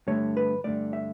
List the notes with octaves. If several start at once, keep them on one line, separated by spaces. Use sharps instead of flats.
G2 D3 A3 C#5
B4
G2 D3 A3 D5
E5